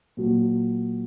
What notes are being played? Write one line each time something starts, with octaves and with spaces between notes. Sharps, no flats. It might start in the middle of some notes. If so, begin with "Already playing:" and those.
A#2 F#3